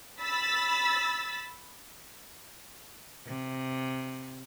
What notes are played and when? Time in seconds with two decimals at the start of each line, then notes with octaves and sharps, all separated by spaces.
0.22 B5 E6 A6 B6
3.27 C3